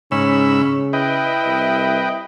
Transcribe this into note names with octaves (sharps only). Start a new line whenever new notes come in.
G#2 C#3 C#4 B5 E6
E4 B4 D#5 G5
C2